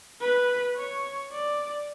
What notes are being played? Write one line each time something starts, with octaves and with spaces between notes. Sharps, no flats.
B4
C#5
D5